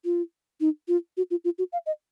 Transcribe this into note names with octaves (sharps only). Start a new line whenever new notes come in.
F4
D#4
F4
F#4
F4
F4
F#4
F5
D#5